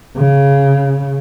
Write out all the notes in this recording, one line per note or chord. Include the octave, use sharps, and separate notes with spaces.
C#3